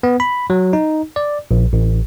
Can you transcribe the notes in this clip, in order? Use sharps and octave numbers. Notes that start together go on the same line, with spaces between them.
B3
B5
F#3
D#4
D5
A#1
A1